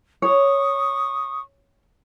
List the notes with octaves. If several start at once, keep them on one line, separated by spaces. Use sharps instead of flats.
C#5 C#6 D#6